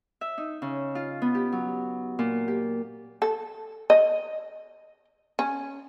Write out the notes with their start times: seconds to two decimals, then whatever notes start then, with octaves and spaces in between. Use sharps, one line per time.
0.21 E5
0.38 D#4
0.62 C#3
0.95 F4
1.22 B3
1.35 G4
1.52 F#3
2.19 A#2
2.48 G4
3.22 A4
3.90 D#5
5.39 C#4